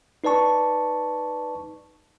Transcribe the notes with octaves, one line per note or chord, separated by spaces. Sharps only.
D#4 B4 D5 A5 C#6